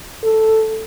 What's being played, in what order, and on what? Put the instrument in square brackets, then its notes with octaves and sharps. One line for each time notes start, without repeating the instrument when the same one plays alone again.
[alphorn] A4